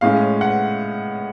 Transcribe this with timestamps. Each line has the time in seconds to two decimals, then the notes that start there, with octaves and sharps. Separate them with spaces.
0.01 A2 G#3 C#4 F5
0.41 F#5